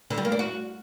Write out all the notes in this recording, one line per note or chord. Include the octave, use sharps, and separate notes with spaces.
D3
G3
A#3
D4
F#4